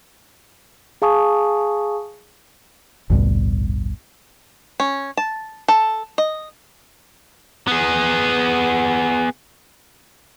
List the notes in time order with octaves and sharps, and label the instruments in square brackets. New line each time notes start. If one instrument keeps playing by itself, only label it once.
[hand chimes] G#4 F5 G#5 A5 C#6 D#6
[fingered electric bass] A1 D2 G2 B2
[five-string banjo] C#4
A5
A4
D#5
[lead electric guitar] B3 G#4